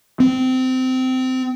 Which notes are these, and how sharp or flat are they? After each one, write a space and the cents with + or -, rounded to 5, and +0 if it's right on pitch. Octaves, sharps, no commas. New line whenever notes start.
C4 -20